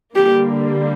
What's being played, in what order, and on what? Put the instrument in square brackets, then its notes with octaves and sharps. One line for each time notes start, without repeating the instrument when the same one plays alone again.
[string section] D3 G3 A#3 [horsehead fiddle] G4